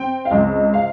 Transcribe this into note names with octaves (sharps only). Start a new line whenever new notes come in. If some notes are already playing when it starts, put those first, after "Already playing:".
Already playing: C4 G5
F5
C#2 D#5
F5